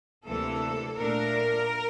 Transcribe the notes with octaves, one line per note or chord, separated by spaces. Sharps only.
D2 C3 E3 A#3 A4
A#2 A3 D4 A#4